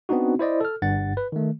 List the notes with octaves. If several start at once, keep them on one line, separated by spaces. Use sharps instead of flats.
B3 C4 D4 D#4 F#4
E4 C5 D5 D#5
A4 F6
G1 G2 F#5 A6
B4
D#3 A3